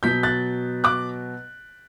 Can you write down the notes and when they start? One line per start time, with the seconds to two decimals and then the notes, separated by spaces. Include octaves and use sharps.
0.03 B2 F#3 B3 G6 B6
0.23 F#6 A6
0.84 D6 F#6